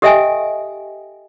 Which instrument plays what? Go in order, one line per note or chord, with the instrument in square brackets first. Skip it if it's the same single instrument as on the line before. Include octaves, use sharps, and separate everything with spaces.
[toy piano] G4 A4 D#5 E5 G5 G#5